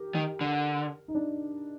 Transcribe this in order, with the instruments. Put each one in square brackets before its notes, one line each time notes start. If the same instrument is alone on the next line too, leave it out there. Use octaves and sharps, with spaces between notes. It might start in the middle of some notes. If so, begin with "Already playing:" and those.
Already playing: [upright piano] G4 A#4
[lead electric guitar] D#3
D3
[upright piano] D#4
D4